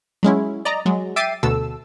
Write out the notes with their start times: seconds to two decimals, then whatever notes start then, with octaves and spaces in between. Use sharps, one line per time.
0.23 F#3 G#3 C#4 E4
0.65 D5 D#5 A#5
0.86 F#3 G#3
1.16 E5 G5 D6 A6 C7 D#7
1.43 D2 B2 A4 E6